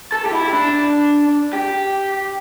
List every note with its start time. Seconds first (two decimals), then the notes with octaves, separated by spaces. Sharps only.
0.12 A4
0.26 G4
0.33 E4
0.53 D4
1.53 G4